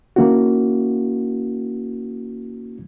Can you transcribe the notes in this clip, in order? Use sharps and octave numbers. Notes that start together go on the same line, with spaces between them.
D#3 A#3 C#4 E4 F#4